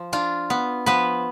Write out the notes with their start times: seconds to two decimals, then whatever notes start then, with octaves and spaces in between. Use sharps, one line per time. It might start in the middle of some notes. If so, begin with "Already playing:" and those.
Already playing: F3
0.13 D4 F4
0.50 B3
0.86 F3 B3 B4